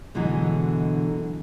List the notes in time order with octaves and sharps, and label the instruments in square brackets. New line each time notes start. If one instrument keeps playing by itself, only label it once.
[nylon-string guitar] B2 D3 E3 F#3 G#3